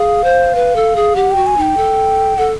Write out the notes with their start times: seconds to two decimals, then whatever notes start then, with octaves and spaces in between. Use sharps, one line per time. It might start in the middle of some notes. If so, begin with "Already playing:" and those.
Already playing: G#4 F5
0.24 C5
0.55 B4
0.76 A4
0.96 G#4
1.16 G4 F#5
1.31 F#4 G5
1.47 G#5
1.57 D#4 G5
1.77 A4
2.38 A4 F#5